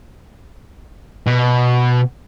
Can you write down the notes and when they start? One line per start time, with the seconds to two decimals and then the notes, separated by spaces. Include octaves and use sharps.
1.26 B2